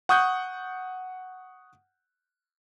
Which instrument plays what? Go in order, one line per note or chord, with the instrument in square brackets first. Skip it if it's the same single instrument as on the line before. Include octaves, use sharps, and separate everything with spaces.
[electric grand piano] F#5 C#6 D#6 F#6 G6